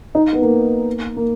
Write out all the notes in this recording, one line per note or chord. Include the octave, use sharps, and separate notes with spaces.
D#4
B3
A#3
A#3